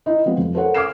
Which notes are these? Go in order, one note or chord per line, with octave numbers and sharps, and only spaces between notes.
D#4 E4 D#5
F3 G3 B3 C4
F2
A4 A#4 C5 C#5 F#5
D6 D#6 F6 G#6 C7 E7